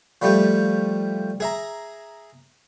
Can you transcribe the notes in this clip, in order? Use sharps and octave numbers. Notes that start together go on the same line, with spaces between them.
F3 G3 A3 G4
G#4 E5 A#5